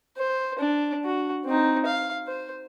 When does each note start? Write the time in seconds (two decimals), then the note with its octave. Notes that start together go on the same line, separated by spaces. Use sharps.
0.17 C5
0.59 D4
1.05 F#4
1.45 C4 D#4
1.86 F5
2.27 C5